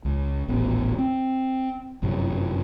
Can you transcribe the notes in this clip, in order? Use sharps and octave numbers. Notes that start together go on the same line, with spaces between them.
C#2
D#1 A1 B3
C4
G1 F#2 C3 F#3